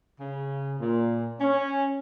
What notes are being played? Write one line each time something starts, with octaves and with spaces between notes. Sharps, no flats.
C#3
A#2
C#4